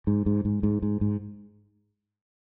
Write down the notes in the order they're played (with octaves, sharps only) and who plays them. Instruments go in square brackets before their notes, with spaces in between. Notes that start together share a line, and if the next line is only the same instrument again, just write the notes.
[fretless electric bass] G#2
G#2
G#2
G#2
G#2
G#2